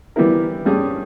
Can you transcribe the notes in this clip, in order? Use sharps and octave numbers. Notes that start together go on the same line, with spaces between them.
E3 G3 B3 E4 A#4
G2 G3 C#4 G#4